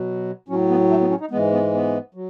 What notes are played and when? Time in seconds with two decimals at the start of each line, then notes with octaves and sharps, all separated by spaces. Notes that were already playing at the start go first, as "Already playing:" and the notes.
Already playing: B2 F#3
0.48 A2 F#3 C#4
0.70 B3
0.90 A3
1.01 B3
1.11 C#4
1.20 D#4
1.31 G#3 B3
1.34 G#2 E3
1.53 B3
1.73 B3
2.15 F#3